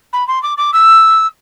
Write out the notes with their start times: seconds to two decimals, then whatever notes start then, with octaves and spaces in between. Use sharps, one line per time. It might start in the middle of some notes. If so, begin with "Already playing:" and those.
0.13 B5
0.28 C6
0.43 D6
0.57 D6
0.73 E6